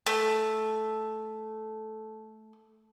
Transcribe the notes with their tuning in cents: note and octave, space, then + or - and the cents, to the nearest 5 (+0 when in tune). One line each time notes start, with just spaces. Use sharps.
A3 -10